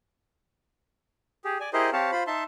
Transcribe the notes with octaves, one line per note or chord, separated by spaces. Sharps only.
G4 G#4
D5 G#5
E4 G4 G#4 A#4 C5 D#5
C4 G4 C#5 F5 A5
F4 C5 B5
D#4 E5 A5 C6